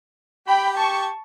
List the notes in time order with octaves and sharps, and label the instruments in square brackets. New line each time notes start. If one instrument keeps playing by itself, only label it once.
[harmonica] G4 [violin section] G5 B5
[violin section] A5 C#6